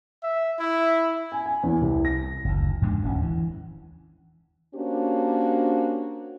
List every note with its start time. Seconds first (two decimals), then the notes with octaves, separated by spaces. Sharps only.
0.23 E5
0.59 E4
1.32 G#5
1.46 G#5
1.63 E2
1.81 C2
2.05 A#6
2.45 F#1 D2
2.82 E2 G2 G#3 D4
3.02 D1 D2 A#3 C#4
3.22 E3
4.75 A#3 C#4 D4 F#4 G4 C5